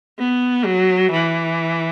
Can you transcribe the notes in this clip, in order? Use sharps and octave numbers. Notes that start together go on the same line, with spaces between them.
B3
F#3
E3